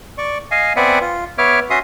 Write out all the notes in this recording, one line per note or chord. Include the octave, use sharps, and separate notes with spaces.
D5 C#6
D#5 F5 G#5
B3 C4 D5 E5 F#5 G#5
F4
B3 C#5 E5 D6 F6
C#4 F#4 E5 C6 D#6